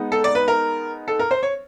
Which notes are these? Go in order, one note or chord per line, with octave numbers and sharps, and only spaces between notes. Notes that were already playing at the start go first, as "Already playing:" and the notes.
Already playing: G#3 B3 D#4
A4
D5
B4
A#4
A4
A#4
C5
C#5